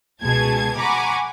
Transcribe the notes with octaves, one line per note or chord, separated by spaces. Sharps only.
C#2 B2 G#4 A5 G#6
F#5 G#5 A#5 B5 C#6 D6